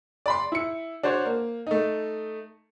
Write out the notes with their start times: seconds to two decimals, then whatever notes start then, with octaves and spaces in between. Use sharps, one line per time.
0.26 D5 B5 C6
0.52 E4 C#7
1.03 D4 F#4 C5 C#5
1.26 A#3
1.67 A3 D#4